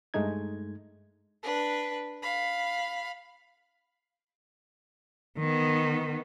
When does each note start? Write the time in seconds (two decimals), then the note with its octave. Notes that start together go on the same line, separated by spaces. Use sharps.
0.14 G2 G#3 A3 D#4 G#6
1.43 D4 B4
2.22 F5 B5
5.39 D#3 B3